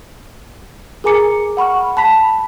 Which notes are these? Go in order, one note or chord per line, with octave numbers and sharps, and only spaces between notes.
G#4 A#4 G#5 A#5 D6 C#7
F#5 B5 C#6 F6
A5 B5 B6